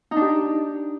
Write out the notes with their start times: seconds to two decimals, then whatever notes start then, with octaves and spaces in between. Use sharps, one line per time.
0.11 D#4
0.16 D4
0.21 G4